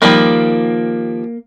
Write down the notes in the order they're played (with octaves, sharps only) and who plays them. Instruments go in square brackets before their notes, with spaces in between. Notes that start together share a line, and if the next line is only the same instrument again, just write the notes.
[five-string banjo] D#3 F3 G3 [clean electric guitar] A#3